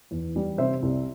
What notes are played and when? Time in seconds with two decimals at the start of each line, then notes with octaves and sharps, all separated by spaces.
0.11 E2
0.36 G3
0.58 C3 C5 E5
0.82 C2